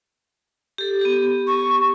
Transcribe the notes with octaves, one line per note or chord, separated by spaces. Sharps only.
G4 A4
B3 G4
C#6